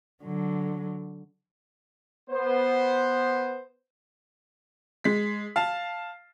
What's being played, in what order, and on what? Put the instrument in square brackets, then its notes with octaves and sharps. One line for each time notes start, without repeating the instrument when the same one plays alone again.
[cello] D3 F#3
[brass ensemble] B3 C5
[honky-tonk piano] G#3 B6
F5 A5